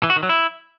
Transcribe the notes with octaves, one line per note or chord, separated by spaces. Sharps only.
E3
F#4
D#3
F#3
E4